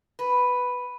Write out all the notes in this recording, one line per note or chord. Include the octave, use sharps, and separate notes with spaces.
B4